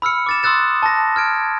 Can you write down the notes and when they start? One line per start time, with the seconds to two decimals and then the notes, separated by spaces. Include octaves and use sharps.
0.02 B5 E6 F6 C#7
0.26 D6 A6 E7
0.43 C6 D#6 E6 F#6 A6 E7
0.82 A5 A#6
1.16 F6 G#6 D7